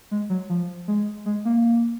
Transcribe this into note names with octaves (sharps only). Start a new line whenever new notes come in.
G#3
F#3
F3
G#3
G#3
A#3